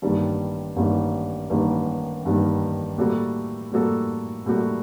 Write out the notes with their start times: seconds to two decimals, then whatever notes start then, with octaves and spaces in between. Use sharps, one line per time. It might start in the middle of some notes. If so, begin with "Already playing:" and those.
0.02 A1 G2 D#3 G3 A#3
0.76 A1 G2 D#3 G3 A#3
1.50 A1 G2 D#3 G3 A#3
2.24 A1 G2 D#3 G3 A#3
2.98 A2 G3 A#3 F#4 A4
3.72 A2 G3 A#3 F#4 A4
4.46 A2 G3 A#3 F#4 A4